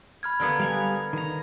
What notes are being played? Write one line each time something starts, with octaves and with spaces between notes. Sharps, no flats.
B5 F6 G#6
D3 A#3 B3
G3 F5 G#5
D#3 A#5